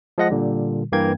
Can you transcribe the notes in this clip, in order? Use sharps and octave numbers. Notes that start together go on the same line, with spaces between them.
F3 G#3 D#5 F#5 A#6
A#2 D3 G3
G2 E3 A#3 F5 G5 G#6